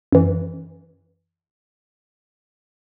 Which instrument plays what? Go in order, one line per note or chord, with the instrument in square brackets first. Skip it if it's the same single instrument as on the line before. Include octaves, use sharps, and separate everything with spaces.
[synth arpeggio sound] F#2 E3